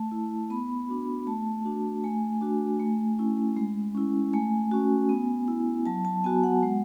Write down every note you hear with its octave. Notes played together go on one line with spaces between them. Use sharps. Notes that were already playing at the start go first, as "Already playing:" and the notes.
Already playing: A3 A5
E4
B3 B5
D4 F#4
A3 A5
D4 F#4
A3 G#5
D4 F#4
A3
C#4 E4
G#3
C#4 E4
A3 G#5
C#4 F#4
B3
E4
F#3 A5
A5
B3 F#4 G#5
F#5
G#3